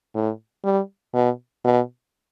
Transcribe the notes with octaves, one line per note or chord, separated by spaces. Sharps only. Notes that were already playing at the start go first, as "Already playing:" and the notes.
A2
G3
B2
B2